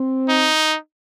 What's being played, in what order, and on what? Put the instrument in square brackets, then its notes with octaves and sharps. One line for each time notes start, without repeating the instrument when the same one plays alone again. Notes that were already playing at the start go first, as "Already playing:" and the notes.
Already playing: [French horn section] C4
[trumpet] D#4